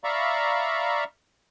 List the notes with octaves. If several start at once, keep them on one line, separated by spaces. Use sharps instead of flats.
D5 E5 F5 A#5 B5 C#6